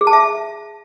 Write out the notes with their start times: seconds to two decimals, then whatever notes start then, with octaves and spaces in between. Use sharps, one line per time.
0.01 G#4
0.07 A5
0.13 E5